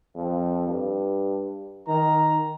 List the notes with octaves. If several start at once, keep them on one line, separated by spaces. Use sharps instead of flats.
F2
G2
D#3 A#5